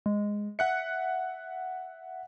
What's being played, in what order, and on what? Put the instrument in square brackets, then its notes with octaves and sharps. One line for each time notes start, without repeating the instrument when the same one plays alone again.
[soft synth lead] G#3
[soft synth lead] E5 [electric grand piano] F#5 F#6 C#7